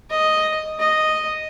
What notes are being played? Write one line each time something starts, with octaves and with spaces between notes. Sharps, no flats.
D#5
D#5